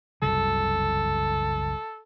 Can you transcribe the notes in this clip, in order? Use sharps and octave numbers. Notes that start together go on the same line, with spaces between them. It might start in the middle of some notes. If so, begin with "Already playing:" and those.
F#1 C2 C#3 A4